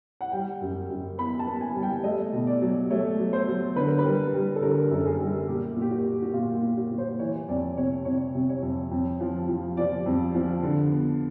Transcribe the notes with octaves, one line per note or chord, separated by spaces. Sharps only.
F#5
G3 G5
F#2
F#2
B3 B5
A5
B3
G#5
G3
G5
A3 D#5
B2
D5
F#3
A3 C#5
F#3
C5
F#3
D3 B4
A#4
B4
G3
G3
A4
D3 A#4
F#2 A4
G#4
G3
A#2 G4
A#2 G4
F#4
A#2
F#4
A#2 F4
F4
A#2
F#4
A#2
C5
E3 C#5
F2 D5
C3 C#5
C3 C#5
C3
C#5
F2
F2
F3
F3
F3 D5
F2
F3
D3
B3